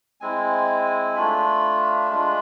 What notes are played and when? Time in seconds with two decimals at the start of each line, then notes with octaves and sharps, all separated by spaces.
0.21 G#3 C4 E4 G#5
1.15 A3 D4 F4 B5
2.10 G#3 D4 F4